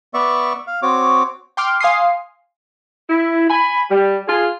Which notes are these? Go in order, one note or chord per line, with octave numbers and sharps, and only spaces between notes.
B3 D5 E5 C#6
F5
C4 F#4 C#5 D6
G5 C6 D6 F6
F5 G#5 C6 D#6 C7
E4
G#5 B5
G3
F4 G#4